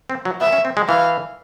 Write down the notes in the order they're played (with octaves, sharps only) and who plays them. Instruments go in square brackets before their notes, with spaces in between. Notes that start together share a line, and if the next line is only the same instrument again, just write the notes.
[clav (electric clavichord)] C4
F#3
[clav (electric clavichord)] B3 [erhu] E5
[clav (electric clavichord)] C#4
C4
G#3
[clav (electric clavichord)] E3 [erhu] F5